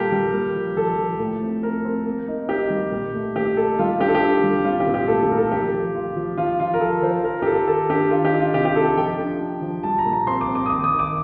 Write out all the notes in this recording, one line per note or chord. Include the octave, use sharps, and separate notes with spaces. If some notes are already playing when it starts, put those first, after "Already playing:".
Already playing: A#2 G3 F4 G4 A4 A#4
G3
A#3
F3
F3 A4
F3
A2
C4
C4 A#4
C4
A#3
D#4
D#4 G4
G3
A#2
A3
A#2 G4
D#4 A4
G3 F4
D4 G4
A4
G4
D4
G3
C4 F4
G4
A#2
G4
A3 A4
G4
A#2 A#4
A4
F3 G4
F3
F4
F3
F3 F4
F3 F4
A#4
F3 A4
F3 C5
F4 A#4
G4
F4 A4
D#3 A4
D4 G4
D#3 F4
G4
D#4
F4
C3 G4
G4
D#4 A4
F3 G5
D4
D4
F3
G3 A5
A#5
A#2
A#5
C4 C6
D6
C4
D6
D#6
D#3 D6
D#6
D#3
D6